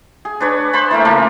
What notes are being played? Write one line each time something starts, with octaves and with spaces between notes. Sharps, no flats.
G#4
D4 B4 C#5
C5 A5 B5
E3 A3 A#3
C#3 F3 A3 A#3